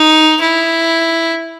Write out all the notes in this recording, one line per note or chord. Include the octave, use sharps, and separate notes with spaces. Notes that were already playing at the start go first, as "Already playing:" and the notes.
Already playing: D#4
E4